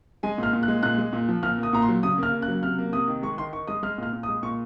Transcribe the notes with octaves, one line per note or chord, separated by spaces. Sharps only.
G#3 G#5
A#2 F6
A#2
F#6
G#3
A#2 F#6
G#3
A#2
F3
A#2 F6
A#3
D#6
A#2 A#5
C6
F#3
C#3 D#6
A#3 F6
C#3
F#6
F#3
C3 F6
A#3
C3 D#6
D#3
G#3 C#6
D#3 C6
D#3 C#6
G#3 D#6
G#3 F6
A#2 F6
A#2
D#6
G#3
A#2 C#6